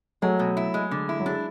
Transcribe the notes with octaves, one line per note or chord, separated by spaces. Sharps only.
F#3 G#3 A3
B2
E4
G#3
D3
E4
F#3
G#3 D4